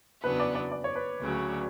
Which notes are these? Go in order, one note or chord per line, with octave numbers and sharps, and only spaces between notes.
E2 C#3 F#3 B3 D4 B4
D5
D5
D5
C#5
B4
D2 C#3 F#3